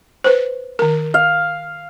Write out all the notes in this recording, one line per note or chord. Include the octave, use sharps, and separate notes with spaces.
B4 C5
D#3 A#4
F5